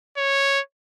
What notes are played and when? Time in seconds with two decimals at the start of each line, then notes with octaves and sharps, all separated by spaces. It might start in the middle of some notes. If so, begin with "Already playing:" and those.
0.17 C#5